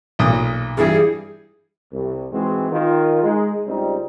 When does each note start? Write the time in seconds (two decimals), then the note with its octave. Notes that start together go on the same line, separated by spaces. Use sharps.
0.19 B1 A#2 D#6
0.77 G2 E3 G3 G#4
1.92 C2
2.31 G#2 E3 G#3 C4 F#4
2.71 D#3 F4
3.23 G#3 D#4
3.66 C#2 G3 C4 D#4